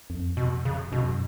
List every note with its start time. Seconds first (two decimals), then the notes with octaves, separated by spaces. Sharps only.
0.10 F2
0.37 B2
0.65 C#3
0.92 F#2 B2